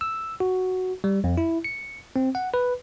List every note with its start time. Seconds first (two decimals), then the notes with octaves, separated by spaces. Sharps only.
0.01 E6
0.40 F#4
1.04 G3
1.24 F2
1.38 E4
1.64 C#7
2.16 C4
2.35 F#5
2.54 B4